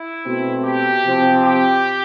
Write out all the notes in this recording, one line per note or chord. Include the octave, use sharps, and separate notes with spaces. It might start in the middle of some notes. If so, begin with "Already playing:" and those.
Already playing: E4
B2 A3 C4
G4
C3 F3 C4
G4